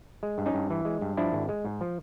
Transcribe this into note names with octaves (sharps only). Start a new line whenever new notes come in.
G#3
G2
C#4 D#4
G2
E3
G#3
G2
F3 D4 E4
G#1
G#3
G#2
F3